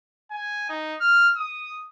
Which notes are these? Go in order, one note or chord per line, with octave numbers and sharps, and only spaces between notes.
G#5
D#4
F6
D#6